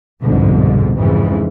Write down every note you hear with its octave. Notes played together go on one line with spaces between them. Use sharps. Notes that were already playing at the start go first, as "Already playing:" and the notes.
G1 C2 F2 G#2 B2 D3
F2 G#2 C#3 E3